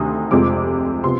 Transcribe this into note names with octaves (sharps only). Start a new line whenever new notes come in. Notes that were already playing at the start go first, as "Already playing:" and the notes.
Already playing: D2 C3 D#3 D#6
F1 F2 C3 F3 G#3 D6
C3 F3 B3 C6